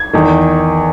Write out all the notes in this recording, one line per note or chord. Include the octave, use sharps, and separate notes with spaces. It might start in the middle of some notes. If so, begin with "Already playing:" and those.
Already playing: G#6
E2 D#3